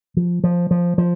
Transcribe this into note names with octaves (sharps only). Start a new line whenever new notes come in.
F3
F3
F3
F3